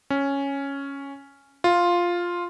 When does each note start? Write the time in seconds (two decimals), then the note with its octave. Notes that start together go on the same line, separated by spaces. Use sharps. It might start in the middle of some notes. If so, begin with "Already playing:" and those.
0.10 C#4
1.64 F4